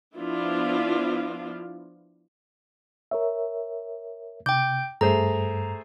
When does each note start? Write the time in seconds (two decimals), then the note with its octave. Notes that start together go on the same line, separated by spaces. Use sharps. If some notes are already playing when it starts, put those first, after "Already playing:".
0.17 F3 B3 D4 E4 F4
3.11 A#4 C#5 E5
4.46 C3 G5 D6 G6
5.01 G2 A3 G#4 C5 A#5